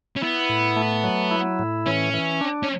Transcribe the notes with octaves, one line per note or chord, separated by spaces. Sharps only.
C#4
B3 E4
A2
A3
F#3
E4
A2
E3 C#4
E3
D4
C#4